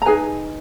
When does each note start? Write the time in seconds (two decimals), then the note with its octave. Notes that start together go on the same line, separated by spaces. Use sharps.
0.02 A#5
0.06 D#4 G#4 B4 G#5